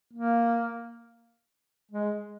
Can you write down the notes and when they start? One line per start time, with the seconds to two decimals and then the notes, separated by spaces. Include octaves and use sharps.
0.13 A#3
1.92 G#3